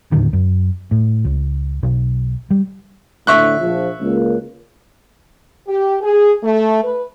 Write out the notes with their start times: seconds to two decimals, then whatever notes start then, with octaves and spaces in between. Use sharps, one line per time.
0.12 D#2 A2 D3 D#3
0.33 F#2
0.91 A2
1.25 C#2
1.83 B1
2.51 G3
3.27 D2 A2 D3 E5 C#6 F#6
3.60 A#1 F3
4.01 C#2 A#3
5.67 G4
6.01 G#4
6.42 A3
6.83 B4